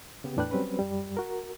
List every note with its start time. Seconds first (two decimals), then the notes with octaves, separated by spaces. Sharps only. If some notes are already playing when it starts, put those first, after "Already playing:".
0.24 C#3 B3 G4
0.37 E2 A2 D4 B4 G5 F#6
0.51 F#3 G3 C4 C#4 B4
0.79 F#2 G3
1.17 F#4 A#4